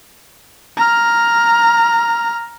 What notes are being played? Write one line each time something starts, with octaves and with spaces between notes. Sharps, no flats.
A#5 F6